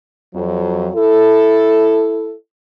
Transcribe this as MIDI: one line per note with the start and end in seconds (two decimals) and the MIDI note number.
0.34 0.90 41
0.34 0.90 54
0.96 2.34 64
0.96 2.34 69